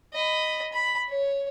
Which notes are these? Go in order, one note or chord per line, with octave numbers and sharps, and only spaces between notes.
D#5 B5
B5
C#5